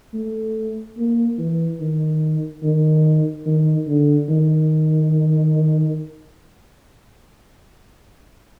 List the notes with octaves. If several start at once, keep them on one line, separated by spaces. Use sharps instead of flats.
A3
A#3
E3
D#3
D#3
D#3
D3
D#3